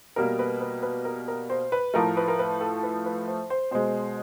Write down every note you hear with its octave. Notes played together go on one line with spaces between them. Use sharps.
B2 G3 A#3 A#4
B4
B4
B4
A#4
A#4
C5
B4
A2 F3 A3 A#4
B4
A#4
B4
A4
B4
B4
C5
C5
B2 G#3 C5